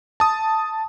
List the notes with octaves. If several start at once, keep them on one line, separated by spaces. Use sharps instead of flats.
A5 D#6